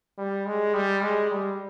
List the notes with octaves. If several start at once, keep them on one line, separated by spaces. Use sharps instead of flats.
G3
G#3
G3
G#3
G3